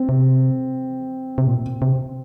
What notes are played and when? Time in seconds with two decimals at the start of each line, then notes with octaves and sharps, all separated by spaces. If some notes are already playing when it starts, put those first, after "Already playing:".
Already playing: C4
0.09 C3
1.38 C3
1.47 A#2
1.82 C3